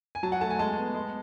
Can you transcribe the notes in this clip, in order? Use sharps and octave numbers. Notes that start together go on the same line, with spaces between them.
G#5
F#3 A5
F#5
A3 A5
G#5
G#3 A5
B3
G#3